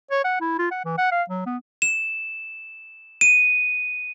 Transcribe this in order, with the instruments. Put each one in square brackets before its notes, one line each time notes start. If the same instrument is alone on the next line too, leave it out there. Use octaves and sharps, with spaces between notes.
[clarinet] C#5
F#5
E4
F4
F#5
E3
F#5
F5
F#3
B3
[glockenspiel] E7
D#7